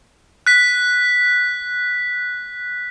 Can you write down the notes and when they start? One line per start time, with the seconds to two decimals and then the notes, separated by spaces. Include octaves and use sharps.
0.47 F#6 B6